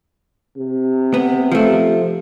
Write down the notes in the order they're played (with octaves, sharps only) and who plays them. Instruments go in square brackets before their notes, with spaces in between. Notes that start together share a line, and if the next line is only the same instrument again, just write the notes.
[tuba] C3
[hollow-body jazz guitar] B3
F3 A3